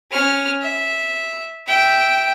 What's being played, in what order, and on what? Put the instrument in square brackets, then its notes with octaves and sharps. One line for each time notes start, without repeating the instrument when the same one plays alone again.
[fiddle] C#4 F6
E5
E5 G5